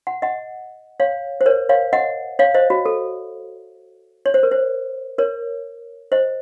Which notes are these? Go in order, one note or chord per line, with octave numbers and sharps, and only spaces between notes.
F#5
D#5 F#5
C#5 F5
C5
A#4 C#5
C#5 F5
D#5 F#5
C#5 F5
C5 D#5
F#4
A4
C#5
C5
A#4
C5
A#4 C#5
C5 D#5